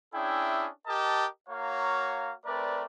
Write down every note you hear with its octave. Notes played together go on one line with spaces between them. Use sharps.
C#4 D4 E4 G#4 E5 G5
G4 A#4 D#5 A5
A#3 F#4 C#5 F5 A#5 C#6
A3 C4 A#4 B4 D5